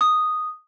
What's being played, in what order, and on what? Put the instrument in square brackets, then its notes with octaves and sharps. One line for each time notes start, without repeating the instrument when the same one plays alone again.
[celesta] D#6